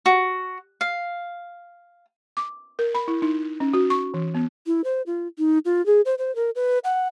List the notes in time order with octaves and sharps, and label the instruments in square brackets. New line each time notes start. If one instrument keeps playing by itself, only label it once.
[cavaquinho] F#4
F5
[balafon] D6
A#4
B5
E4
D#4
C#4
F#4
C#6
E3
B3
[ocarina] E4
C5
F4
D#4
F4
G#4
C5
C5
A#4
B4
F#5